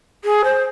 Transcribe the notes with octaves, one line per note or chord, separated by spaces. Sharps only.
G#4
C5